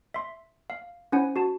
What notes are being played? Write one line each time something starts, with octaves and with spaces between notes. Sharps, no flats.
E5 C6
F5
C#4 E4 C5 F#5 G#5
F#4 A5